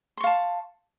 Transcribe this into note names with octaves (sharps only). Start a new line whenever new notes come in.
F5 A5 C6 C#6